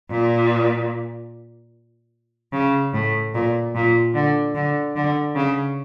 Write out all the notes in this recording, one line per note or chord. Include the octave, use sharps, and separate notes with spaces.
A#2
C#3
A2
A#2
A#2
D3
D3
D3
C#3